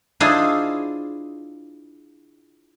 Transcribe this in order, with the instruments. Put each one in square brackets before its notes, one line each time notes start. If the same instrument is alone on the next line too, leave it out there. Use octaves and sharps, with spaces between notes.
[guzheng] D4 E4 F4 G#4 C5 D#5